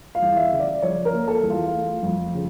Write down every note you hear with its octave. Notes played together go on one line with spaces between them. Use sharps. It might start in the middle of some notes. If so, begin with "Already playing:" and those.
F5
E2
E5
C#3
D5
F3 C#5
A#4
A#3
A4
E2
F4
A3
F2
C#3